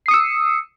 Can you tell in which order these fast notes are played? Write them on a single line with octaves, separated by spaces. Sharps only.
C7 D#6 C#7 E6